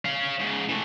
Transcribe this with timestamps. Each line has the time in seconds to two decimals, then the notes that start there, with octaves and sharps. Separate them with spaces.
0.05 C#4 F5
0.40 G#2 C#3
0.69 E3 A3